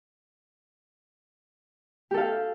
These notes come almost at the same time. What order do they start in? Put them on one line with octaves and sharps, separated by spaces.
G4 A4 F5